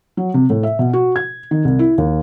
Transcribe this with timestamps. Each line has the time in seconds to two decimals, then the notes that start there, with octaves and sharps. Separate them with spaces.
0.17 F#3
0.34 C3
0.50 A2
0.63 E5
0.79 B2
0.93 F#4
1.16 G#6
1.51 D#3
1.65 C2
1.79 E4
1.98 D#2